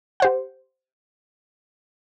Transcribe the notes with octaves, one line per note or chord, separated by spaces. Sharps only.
G4 C5 F#5